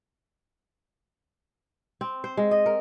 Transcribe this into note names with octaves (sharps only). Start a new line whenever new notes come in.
C4
C5
G#3
D#5
A#4